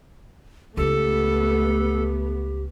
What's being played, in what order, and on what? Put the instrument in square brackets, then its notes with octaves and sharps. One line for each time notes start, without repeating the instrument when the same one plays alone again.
[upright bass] C#2 F4 [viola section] A3 B3 [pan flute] G4 [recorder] A4